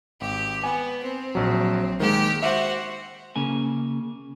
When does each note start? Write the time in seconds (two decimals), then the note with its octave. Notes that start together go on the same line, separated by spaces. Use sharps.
0.21 G#1 G4
0.64 B3 G#5
1.03 C4
1.35 A#1 F#3
2.00 D#3 G#3 A#3 G4 G5
2.42 F#4 C5 E5
3.36 C#3 A#3 G#5